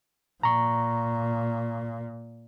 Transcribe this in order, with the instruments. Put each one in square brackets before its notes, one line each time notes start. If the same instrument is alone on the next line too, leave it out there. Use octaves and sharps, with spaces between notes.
[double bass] A#2 [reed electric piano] A#5 C#6